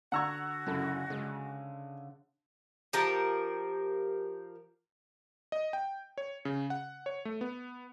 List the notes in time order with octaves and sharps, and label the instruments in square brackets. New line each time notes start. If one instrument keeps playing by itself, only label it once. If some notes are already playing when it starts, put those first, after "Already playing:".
[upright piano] D3 E6 G#6 [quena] F#4 [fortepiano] F#5 A#5 C#6
[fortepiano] F#2 E4 A4 [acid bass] C#3
[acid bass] C#3 [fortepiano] G#3
[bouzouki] F3 G4 A#4 A5
[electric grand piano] D#5
G5
C#5
C#3
F#5
C#5
A3
B3